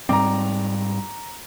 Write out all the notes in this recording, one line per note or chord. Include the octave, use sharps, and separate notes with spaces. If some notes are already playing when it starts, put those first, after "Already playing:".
G#2 G3 C4 A#5 D6